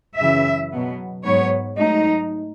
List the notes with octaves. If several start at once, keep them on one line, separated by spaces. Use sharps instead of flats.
F#2 C#3 E3 E5
B2 F#3 B3
G#2 F#3 B3 C#5
G#2 F#3 A3 D#4